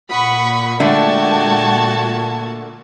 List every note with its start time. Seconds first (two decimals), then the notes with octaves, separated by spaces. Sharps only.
0.11 A#2 F#5 B5 C#6 D#6
0.80 D3 G#3 A3 F#4 G5 A5 G#6